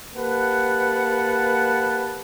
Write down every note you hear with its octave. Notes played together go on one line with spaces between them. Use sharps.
A#3 G4 B4 F#5 A5